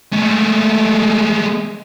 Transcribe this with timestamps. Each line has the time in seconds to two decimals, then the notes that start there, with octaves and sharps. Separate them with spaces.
0.12 G#3 A3